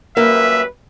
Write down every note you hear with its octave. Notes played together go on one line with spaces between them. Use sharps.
F#2 G3 A#3 B4 E5